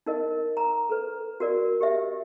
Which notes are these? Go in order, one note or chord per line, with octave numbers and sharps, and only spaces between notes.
D#4 A#4 D#5
A#5
A4 B4
F#4 A#4 D5
G4 D#5 E5